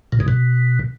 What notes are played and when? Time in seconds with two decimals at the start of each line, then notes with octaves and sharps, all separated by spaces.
0.12 A#2
0.20 G#2
0.28 B2